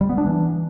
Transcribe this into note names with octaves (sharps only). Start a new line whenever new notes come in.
G3
B3
D4
E3